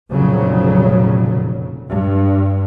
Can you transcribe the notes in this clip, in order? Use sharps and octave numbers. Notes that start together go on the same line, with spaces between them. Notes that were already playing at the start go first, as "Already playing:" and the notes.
F1 F2 A#2 C#3 F#3 G3
G2